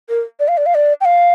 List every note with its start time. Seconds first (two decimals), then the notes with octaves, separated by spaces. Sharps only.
0.09 A#4
0.40 D5
0.48 F5
0.57 D5
0.66 F5
0.75 D5
1.01 G5
1.05 F5